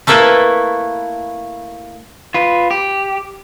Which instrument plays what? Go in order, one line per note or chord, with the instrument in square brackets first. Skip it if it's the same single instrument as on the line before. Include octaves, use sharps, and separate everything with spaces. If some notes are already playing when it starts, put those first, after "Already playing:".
[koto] A3 A#3 E4 A4 B4
[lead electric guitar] F4 B4
G4